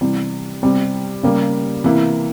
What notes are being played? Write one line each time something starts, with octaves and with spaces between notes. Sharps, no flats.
C3 E3 G3
C3 G3 C4
C#3 G3 A#3
C3 E3 A#3 E4